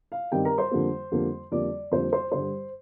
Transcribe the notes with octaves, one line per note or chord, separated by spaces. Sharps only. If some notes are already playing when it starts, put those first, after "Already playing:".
F5
G2 D#3 G3 C4 G4 G5
A#4 A#5
C5 C6
F2 D3 G3 A#3
F2 D3 G3 A#3
F2 D3 G3 A#3 D5 D6
F2 D3 G3 A#3 C5 C6
C5 C6
G2 D3 G3 C5 C6